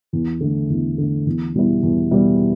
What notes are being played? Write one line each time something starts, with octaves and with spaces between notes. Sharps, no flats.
E2
D3 A3
E2
D3 A3
E2
B2 G3 B3 E4
E2
B2 G3 B3 E4